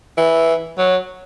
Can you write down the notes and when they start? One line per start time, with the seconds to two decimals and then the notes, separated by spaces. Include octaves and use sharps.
0.17 E3
0.78 F#3